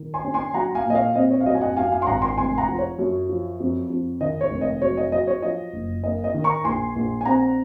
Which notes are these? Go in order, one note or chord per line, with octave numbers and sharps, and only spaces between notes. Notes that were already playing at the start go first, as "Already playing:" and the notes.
Already playing: D#3
G#5 C6
C#4
G#5 C6
F#3 F#5 A#5
F5 G#5
A#2
D#5
C#5 F5
C4 D#5
C#5
F5
F#2 D#5
G#5
D#5 F#5
F#2 F5 G#5
F5 G#5
C6
G#1 F#5 A#5
G#5 C6
F1 G#5 C6
F#5 A#5
F3
C#5
F#2
F3
F2
F2
D#3 D#5
C#5
F1
D#5
F#3 C#5
D#5
F#3 D#5
C#5
F3 D#5
F#1
A#3 D#5
D#5
D#3
A#5 C#6
A#1 G#5 C6
A#1
G#5
C4 F#5 A#5